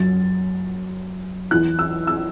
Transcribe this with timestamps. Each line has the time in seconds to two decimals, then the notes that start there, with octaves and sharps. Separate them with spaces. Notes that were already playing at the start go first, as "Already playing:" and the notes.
Already playing: F#2 F#3 A6
1.51 E2 E3 F#6
1.79 E6
2.07 E6